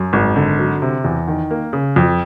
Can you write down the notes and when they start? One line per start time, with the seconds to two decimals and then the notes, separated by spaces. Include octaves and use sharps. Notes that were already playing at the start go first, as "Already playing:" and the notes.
Already playing: F#2
0.13 G#1
0.36 D3
0.59 F#3
0.82 C3
1.04 E2
1.28 D#3
1.51 A#3
1.73 C#3
1.96 F2